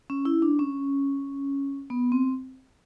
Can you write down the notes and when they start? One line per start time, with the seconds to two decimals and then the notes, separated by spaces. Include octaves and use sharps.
0.10 C#4
0.25 E4
0.42 D4
0.59 C#4
1.90 B3
2.12 C4